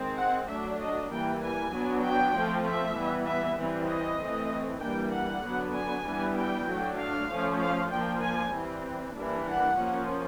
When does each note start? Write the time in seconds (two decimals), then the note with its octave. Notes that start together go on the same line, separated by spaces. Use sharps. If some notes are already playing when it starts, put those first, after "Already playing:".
Already playing: D#3 G#3 C4
0.17 F#5
0.48 F#3 A3 D4 E5
0.79 D#5
1.10 E3 G3 A#3 G5
1.41 G#5
1.71 F#3 B3 D4
2.02 G5
2.33 F3 A3 C4
2.64 E5
2.95 E3 G3 B3
3.26 E5
3.57 E3 G3 C4
3.88 D#5
4.19 E3 A3 C4
4.81 E3 G3 A#3 D4 G5
5.12 F#5
5.43 D3 F#3 B3 D4
5.74 G#5
6.05 E3 G3 B3 D4
6.36 G5
6.67 F#3 A3 D4
6.98 F5
7.29 F3 A3 C#4
7.60 F5
7.91 F3 A#3 D4 G5
8.22 G#5
8.52 E3 G3 C4
9.14 E3 G3 A#3 D4
9.45 F#5
9.76 F3 A#3 C#4